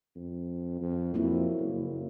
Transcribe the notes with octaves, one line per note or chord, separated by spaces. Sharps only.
F2
F2
F2 F#3 A#3 E4
F#1